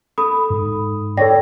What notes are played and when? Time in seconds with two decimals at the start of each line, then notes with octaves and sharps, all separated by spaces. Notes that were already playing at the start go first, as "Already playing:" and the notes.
0.18 A4 B5 D#6
0.50 G#2
1.17 A4 C#5 D5 G5 A#6